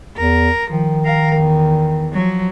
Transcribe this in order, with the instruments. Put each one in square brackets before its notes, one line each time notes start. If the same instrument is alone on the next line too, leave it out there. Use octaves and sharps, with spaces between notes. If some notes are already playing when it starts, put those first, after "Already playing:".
[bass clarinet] E2 [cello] A#4
[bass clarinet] D#3 [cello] F3
[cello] A#4 F5
E2
F3 F#3